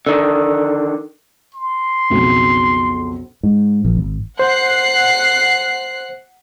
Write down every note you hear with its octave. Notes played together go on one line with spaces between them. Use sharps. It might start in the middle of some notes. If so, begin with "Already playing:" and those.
D3 D#3
C6
B1 F2 C#3
G#2
A#1
G#1
C5 F#5 F#6 C7